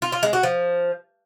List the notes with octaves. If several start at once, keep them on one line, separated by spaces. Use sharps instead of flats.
F4
F4
G#3
F#4
F3